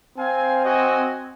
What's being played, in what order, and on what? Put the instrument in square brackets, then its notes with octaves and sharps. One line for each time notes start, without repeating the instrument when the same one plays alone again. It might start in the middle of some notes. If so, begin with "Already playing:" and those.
[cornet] C4 [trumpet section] F5 G#5
[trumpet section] F#4 D#5 G#5